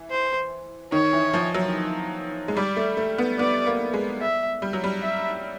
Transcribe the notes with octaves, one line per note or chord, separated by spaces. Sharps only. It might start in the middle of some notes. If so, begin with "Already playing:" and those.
Already playing: E3
C5
D#3 C#5
E3
F3
F#3
G#3
G3 D5
A3
A3
B3
B3 D5
A#3
G#3
E5
G3
F#3
G3
E5